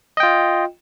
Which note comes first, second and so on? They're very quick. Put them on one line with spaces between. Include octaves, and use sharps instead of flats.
D#5 G5 F4